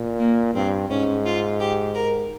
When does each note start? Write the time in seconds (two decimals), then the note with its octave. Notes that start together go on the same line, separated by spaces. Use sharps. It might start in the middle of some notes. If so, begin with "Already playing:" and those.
Already playing: A#2
0.19 A#3
0.54 G2 C4
0.90 G#2 C#4
1.25 F4
1.60 G4
1.94 A#4